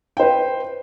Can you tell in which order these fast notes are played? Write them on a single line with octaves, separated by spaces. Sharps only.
G5 C5 B4